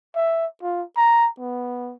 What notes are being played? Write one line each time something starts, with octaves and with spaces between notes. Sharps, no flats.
E5
F4
A#5
B3